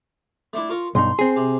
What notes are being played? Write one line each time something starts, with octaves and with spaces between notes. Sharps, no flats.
A3 D4 E4
F4 A#4 C#6
B1 G2 D#4 C6
C4 G#4
C3